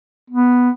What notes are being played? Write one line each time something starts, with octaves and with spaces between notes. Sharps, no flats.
B3